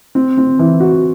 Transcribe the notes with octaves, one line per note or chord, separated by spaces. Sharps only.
C4
C4
E3
F#4